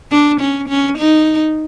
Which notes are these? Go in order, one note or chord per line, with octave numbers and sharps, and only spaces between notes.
D4
C#4
C#4
D#4